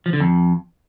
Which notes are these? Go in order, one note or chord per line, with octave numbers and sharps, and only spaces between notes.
F3
D3
F2